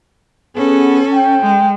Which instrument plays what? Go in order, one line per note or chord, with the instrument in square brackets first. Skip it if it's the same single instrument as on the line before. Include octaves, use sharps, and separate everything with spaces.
[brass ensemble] B3 G#4 [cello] C#4 A4
[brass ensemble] G5
[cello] G#3